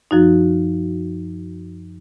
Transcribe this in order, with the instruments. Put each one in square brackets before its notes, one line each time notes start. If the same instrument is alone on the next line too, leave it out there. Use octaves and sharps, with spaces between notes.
[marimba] F#2 F3 D#4 F#4